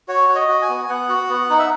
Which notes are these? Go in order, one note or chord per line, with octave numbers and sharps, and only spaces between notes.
F#4 C#5
F#4
D#5
F#4
G#5
B3
B3 F#5
F#4
B3
D#4
E5